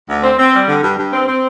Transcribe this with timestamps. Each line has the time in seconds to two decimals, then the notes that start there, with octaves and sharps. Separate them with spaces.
0.09 D2
0.23 C4
0.38 C4
0.53 G3
0.68 D3
0.83 G2
0.98 G2
1.12 C4
1.27 C4